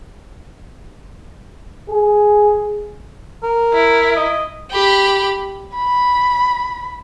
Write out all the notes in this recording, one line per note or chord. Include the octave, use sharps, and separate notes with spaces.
G#4
A#4
E4
D#5
G4 B5
B5